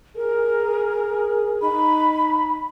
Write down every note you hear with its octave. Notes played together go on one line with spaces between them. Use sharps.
G#4 A#4
D#4 B5